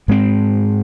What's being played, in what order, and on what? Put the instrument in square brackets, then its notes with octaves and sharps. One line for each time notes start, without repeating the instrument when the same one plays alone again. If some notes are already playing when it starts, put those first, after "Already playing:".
[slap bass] G#2 G#3 C4